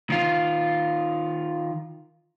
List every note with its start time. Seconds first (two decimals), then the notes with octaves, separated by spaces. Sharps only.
0.10 D#3 F4